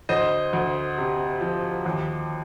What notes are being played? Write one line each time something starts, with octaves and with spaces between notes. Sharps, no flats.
D2 C5 D#5
D2
C3
F3
D#2